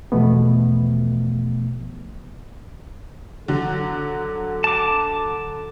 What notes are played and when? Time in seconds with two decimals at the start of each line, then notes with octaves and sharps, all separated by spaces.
0.12 E2 B2 F3 A3 B3
3.48 D3 F#3 F#4 A4
4.64 A5 D6